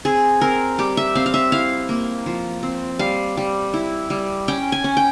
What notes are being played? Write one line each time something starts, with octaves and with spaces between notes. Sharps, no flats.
C4 G#4
C4 A#4
G3 G4
E5
C4 F5
F5
E5
E4 F5
A#3
F3
C4
G3 F5
G3
E4
G3
C#4 G5
G#5
C#4
G5